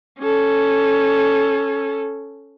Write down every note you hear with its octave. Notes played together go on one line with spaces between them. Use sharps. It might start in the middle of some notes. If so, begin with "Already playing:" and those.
C#4 A4